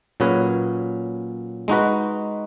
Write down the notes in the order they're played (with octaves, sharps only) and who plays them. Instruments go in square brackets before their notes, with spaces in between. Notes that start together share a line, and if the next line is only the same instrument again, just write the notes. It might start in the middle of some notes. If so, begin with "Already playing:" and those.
[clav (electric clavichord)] A#2 F#3 C#4 G#4 B4
G#3 D#4 F#4 B4